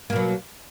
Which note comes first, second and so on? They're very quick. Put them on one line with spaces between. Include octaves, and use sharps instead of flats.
A#3 B2 F#3